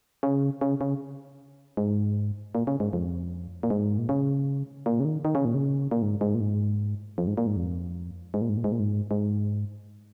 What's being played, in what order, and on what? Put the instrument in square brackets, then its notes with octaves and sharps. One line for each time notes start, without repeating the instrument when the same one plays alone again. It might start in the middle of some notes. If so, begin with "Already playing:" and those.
[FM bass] C#3
C#3
C#3
G#2
A#2
C#3
G#2
F2
A#2
G#2
A#2
C#3
A#2
C#3
D#3
D#3
C#3
A#2
C#3
A#2
G#2
G#2
A#2
G#2
F2
G#2
A#2
G#2
F2
G#2
A#2
G#2
A#2
G#2
A#2
G#2
G#2